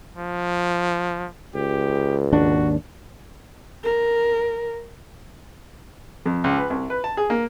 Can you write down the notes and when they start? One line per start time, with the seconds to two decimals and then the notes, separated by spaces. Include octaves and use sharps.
0.17 F3
1.55 C#2 G4
2.32 G#1 D#2 D4 F#4
3.84 A#4
6.26 F2
6.44 C#2
6.58 B4
6.70 C2
6.90 B4
7.04 A5
7.17 G#4
7.30 A#3